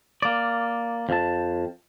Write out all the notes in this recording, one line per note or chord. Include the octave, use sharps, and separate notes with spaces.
A#3 D5
F2 A5